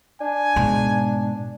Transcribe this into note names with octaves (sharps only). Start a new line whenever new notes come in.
D4 G#5
G#2 B2